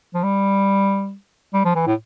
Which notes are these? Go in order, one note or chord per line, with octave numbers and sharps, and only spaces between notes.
F3
G3
G3
F3
E3
A2